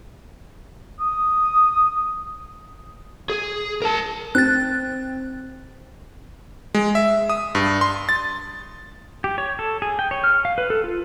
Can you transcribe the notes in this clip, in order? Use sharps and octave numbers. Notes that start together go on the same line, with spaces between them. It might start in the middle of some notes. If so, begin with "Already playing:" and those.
D#6
G#4
A#4 A5
C4 F#6 A6
G#3
E5
D#6
G2
C6
A6
G4
C#5
A4
G#4
G5
C#5
F6
F5
B4
A4
F4